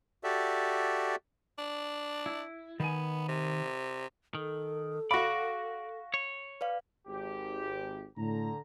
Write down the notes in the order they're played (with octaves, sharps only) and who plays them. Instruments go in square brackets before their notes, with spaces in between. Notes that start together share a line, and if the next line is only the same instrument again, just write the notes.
[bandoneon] F#4 G4 A4 D5 E5
[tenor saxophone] D4
[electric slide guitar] E4
[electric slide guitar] D#3 G#5 [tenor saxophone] B3
[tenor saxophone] C3
[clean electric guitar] D#3 [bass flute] A4
[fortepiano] F#4 B5 [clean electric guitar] D5 [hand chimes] F5 C#6 A#6
[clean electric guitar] C#5
[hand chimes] B4 D5 F5
[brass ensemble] G#1 G4
[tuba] A2 [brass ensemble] D3 A#5